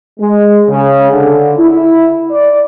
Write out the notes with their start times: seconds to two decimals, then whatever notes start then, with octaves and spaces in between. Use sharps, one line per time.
0.20 G#3
0.69 C#3
1.11 D3
1.59 E4
2.31 D5